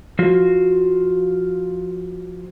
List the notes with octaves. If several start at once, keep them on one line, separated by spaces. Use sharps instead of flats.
F3 F4 F#4